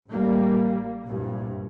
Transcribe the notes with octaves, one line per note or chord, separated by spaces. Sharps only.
A1 G3 A#3
C2 G2 A#2